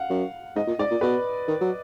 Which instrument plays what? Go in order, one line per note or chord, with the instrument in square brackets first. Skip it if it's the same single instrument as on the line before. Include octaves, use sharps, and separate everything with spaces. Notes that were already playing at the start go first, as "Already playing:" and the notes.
Already playing: [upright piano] F5 F#5
[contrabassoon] F#2
[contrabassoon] G#2 [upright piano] D#5
[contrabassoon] A#2
[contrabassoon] G#2 [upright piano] D5
[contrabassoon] A#2
[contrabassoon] B2 [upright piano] B4
[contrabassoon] D#3
F#3